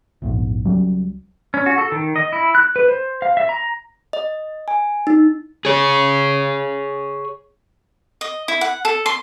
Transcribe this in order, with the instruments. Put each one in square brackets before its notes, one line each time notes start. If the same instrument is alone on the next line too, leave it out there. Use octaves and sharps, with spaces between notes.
[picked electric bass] A#1 E2 G#2
C#2 F#3 G3 C#4
[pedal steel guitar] C#4
F#4
A4
D#3
D#5
E4
F#6
B4
C5
F5
E5
A#5
[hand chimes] D#5
G#5
D#4
[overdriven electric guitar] G#4 C#5
[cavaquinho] D#5
E4
F#5
A4
C6